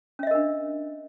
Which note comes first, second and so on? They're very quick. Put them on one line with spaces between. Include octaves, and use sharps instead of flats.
C#4 E5 D#5 A#4 D4